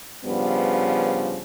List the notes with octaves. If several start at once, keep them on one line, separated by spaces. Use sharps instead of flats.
G2 C#3 F3 B3